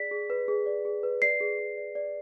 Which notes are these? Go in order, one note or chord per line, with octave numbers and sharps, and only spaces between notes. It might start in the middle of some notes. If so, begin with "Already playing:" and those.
Already playing: G#4 D5 B6
G#4
B4
G#4
D5
G#4
B4
D5 C7
G#4
G#4
D5
D5